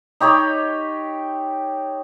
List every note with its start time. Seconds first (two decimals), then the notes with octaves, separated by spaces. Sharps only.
0.20 D#4 G4 C#5 B5